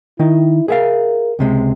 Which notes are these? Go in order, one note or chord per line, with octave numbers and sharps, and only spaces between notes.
D#3 D#4 E4
G#4 A#4 E5 F5
C#2 C3 G#3